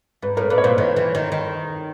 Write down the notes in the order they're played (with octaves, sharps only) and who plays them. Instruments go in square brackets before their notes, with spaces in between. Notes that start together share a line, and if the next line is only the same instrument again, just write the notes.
[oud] G#2 [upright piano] B4
[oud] A2 [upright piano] A#4
[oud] A#2 [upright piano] B4
[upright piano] C#5
[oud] A#2 [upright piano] C5
[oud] D#3 [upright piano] B4
[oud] E3
D#3
D#3